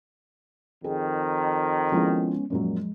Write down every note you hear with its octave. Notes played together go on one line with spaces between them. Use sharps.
F2 D#3 G#4
F3 G#3 B3 C#4 E4 G#4
F#2 A#2 F3 F#3 G#3